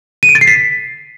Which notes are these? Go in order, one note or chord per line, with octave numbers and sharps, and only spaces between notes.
D#7
D7
A6
C7
B6